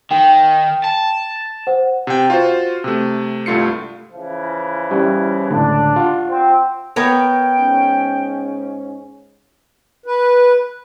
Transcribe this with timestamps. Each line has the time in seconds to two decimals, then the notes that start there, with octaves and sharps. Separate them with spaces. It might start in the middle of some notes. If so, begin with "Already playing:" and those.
0.11 D#3 G5
0.84 A5
1.67 C5 F#5
2.07 C3 G5
2.30 F4 F#4 C5
2.84 C3 A3
3.46 C2 G2 A3 F4 C7 C#7
4.13 C#3 E3 F3
4.91 G3 C#4 E4
5.51 C#2 A2 D3 D4
5.96 F4 F#5
6.30 C4
6.96 B3 A#4 C#5 G5
7.58 G#2 C#4
10.06 B4